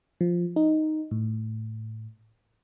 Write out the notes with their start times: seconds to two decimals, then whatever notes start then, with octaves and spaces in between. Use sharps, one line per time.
0.21 F3
0.56 D#4
1.11 A2